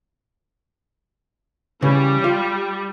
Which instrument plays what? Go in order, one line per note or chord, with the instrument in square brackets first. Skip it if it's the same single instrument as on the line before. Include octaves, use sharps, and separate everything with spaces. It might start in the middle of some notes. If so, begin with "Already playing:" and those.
[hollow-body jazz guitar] C#3 E3 [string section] G3
[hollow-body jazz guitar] F4 F5